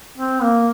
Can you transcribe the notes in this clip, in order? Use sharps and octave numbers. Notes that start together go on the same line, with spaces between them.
C4
A#3